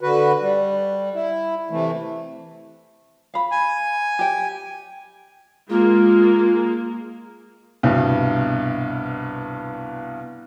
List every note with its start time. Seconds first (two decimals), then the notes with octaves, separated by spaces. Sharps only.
0.01 D3 F#4 B4
0.41 G3
1.15 E4
1.70 C3 E3 A3
3.34 F5 B5
3.52 G#5
4.19 G4 G5
5.70 G#3 A#3 F4
7.83 C2 G2 B2